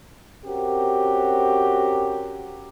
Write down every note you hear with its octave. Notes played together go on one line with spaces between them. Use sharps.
C4 C#4 F#4 G4 A#4